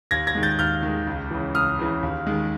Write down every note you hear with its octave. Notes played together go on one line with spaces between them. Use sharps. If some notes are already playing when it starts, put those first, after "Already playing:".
D#2 G#6 A#6
G#6 A#6
D#3 G#3
G6 A6
D#2 F6 G6
D#3
G#3
C#2
C#3 E3
C#2 D#6 F6
C#3 E3
D#2
D#3 G#3